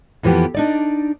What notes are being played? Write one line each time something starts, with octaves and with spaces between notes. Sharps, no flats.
F2 E3 F3 B3 G4
D4 D#4 D5